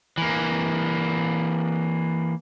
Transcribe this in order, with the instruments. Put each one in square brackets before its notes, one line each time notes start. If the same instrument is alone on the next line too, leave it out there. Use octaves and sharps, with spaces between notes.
[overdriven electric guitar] E3 A#3